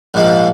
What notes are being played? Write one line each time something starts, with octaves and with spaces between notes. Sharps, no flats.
A#1 G#2 F3